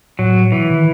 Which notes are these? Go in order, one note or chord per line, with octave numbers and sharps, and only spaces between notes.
A2 F#3
B2 E3
D#3